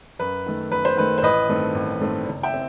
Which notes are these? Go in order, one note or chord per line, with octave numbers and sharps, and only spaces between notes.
F#2 B4
D#3 A3
F#2 B4
C5
D#3 A3 B4
C5
A1 B4 D#5
G2 D#3 A3 C4
A1
G2 D#3 A3 C4
F#1
E5 G5
C4